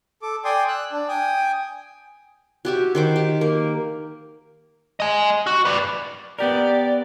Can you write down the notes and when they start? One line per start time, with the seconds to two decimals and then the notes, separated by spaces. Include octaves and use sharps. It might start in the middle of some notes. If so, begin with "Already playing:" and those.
0.22 A4 D6
0.44 D5 G5 G#5 C6 D#6
0.68 E6 F#6
0.92 D4
1.09 G5 G#5 D#6
2.65 F#4 G4 E5
2.95 D#3 C5 D6
3.16 G4
3.41 A#3
5.00 D#5 G#5
5.47 F#4
5.65 B4 D5
6.39 B3 G4 A#4 D5